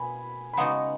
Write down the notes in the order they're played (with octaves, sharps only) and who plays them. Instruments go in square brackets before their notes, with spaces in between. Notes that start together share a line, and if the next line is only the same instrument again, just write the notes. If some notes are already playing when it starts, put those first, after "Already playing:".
Already playing: [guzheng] B2 [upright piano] G#5 B5
[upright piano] B5
[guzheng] C#3 G#3 B3 D#4 F#4 [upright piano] F#5 A#5